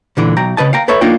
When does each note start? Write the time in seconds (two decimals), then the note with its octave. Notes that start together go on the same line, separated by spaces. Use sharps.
0.17 A#2 D3 E3
0.37 B1 G5 A#5
0.57 C#3 B4 D#5 A5
0.73 F5 G5 A#5
0.88 A4 B4 C#5 E5
1.01 A#3 D4 D#4 F4 D#5 G5